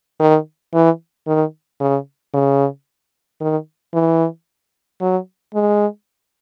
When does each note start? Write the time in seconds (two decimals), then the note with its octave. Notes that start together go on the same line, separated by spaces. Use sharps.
0.20 D#3
0.74 E3
1.27 D#3
1.80 C#3
2.34 C#3
3.41 D#3
3.94 E3
5.01 F#3
5.54 G#3